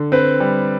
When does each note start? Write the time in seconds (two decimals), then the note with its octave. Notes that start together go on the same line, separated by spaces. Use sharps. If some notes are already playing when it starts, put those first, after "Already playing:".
Already playing: D3
0.12 C4 B4
0.40 G3